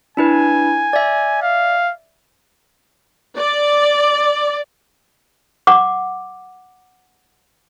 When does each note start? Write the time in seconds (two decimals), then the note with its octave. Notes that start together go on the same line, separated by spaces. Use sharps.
0.17 D4 E4 B4 G#5
0.93 D5 E5
1.42 F5
3.37 D5
5.67 F#5 D6